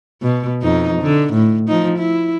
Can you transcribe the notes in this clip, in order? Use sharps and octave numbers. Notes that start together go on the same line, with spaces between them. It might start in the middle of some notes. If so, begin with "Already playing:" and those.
B2
F2 D#4
D3
A2
F3 D#4
E4